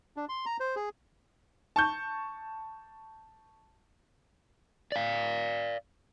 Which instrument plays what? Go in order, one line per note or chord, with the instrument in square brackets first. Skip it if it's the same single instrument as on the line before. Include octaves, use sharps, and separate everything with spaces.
[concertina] D4
C6
A#5
C5
G#4
[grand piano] A5 C#6 G6
[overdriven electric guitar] D5 F5